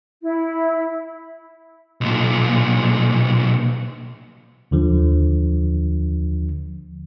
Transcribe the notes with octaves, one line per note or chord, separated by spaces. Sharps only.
E4
B1 A#2
D#2 D3 F3